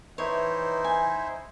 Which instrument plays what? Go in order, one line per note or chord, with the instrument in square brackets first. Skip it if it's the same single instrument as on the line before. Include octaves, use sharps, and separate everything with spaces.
[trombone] E3 [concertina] D#4 E4 C5 [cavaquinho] C#5
[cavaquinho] G#5